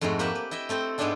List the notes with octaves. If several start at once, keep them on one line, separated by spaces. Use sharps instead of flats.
F2 G#2 G#3 A3 F#4
A#3 G4 B4 E5 F#5
B4
E4 D#5 E5 G5
A3 C4 A4 G5
G#2 G#3 B3 C4 D4 E4